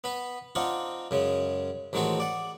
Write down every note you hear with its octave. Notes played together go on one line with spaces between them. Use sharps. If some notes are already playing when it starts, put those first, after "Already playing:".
B3 B4
C4 D4 D#4 F4 F#5
F#2 C#3 G#3
A1 D#3 G#3 C4 F#4 A4
D5 F#5